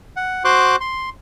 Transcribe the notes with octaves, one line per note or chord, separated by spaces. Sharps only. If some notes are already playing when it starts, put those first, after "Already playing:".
F#5
F#4 C5 C6 D6 F#6
C6